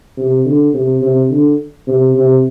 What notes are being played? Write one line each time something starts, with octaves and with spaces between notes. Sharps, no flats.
C3
D3
C3
C3
D3
C3
C3